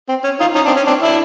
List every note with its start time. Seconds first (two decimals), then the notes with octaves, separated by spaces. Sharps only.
0.09 C4
0.24 C#4
0.40 D#4 F4
0.55 C#4 D#4
0.66 C4 D4
0.76 C#4
0.87 C4 D4
1.02 D4 E4